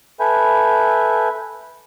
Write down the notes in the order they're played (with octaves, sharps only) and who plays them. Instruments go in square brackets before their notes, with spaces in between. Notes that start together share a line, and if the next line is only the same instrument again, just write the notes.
[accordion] A4 B4 E5 G#5 B5 G6